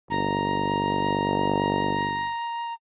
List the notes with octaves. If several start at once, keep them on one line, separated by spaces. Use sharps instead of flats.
G1 A#5